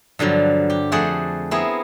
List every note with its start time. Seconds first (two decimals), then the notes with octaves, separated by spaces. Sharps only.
0.19 G2 D3 F3 F#3
0.70 G4
0.92 F2 A3 G#4 C5 D5 F#5
1.51 B3 C4 E4 G#4 A#4